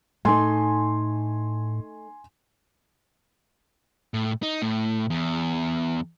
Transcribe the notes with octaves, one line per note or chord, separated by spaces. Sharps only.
A2 A3 D#4 G#5 C6
A2
D#4
A2
E2